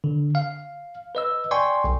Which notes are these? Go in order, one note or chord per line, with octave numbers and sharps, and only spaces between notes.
D3
F5
B4 D#5 E6
D5 G5 G#5 C6 C#6
B1